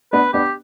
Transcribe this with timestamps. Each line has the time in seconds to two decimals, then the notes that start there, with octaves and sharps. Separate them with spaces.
0.13 B3 D4 B4
0.33 B3 D4 G4